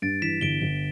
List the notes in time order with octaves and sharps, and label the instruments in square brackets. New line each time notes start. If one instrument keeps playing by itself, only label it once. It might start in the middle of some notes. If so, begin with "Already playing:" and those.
[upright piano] G2 [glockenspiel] A6 D7
[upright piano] E3 [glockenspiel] B6 E7
[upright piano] G1 [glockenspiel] D7 G7
[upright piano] G1